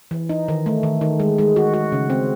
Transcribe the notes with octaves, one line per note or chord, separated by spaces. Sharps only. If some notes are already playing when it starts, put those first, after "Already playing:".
E3
D#4
D#3
A3
D#3
D#3
G#3
G#3
F#4
F#4
C#3
C4